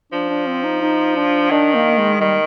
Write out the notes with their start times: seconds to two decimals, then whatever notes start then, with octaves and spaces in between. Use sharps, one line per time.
0.12 F3 D4
0.29 D4
0.47 C4
0.64 D#4
0.81 D#4
1.16 D4
1.51 D#3 D4
1.75 A#3
1.98 G#3
2.20 D#3 G3